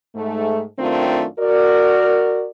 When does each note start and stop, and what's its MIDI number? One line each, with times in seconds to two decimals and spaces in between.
0.16 0.63 44
0.16 0.63 57
0.79 1.25 42
0.79 1.25 51
0.79 1.25 57
0.79 1.25 60
0.79 1.25 62
0.79 1.25 65
1.39 2.46 66
1.39 2.46 70
1.39 2.46 74